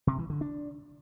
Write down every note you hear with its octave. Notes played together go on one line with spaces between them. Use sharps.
C3
E3
D3
D4